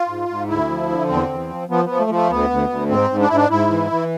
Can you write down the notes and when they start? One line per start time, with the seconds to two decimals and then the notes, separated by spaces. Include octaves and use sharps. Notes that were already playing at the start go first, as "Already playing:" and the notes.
Already playing: F4
0.08 G#2
0.28 G#2
0.48 D2 E4
0.69 F3
0.89 D3
1.09 E2 C4
1.29 E2
1.49 F3
1.69 F3 B3
1.85 F3 B3
2.00 A3
2.09 F3
2.14 A3
2.29 D2 B3
2.50 D2
2.70 D2
2.89 G#2 C4
3.10 G#2
3.21 D4
3.29 G#2 E4
3.35 D4
3.50 G#2 E4
3.70 E3
3.90 E3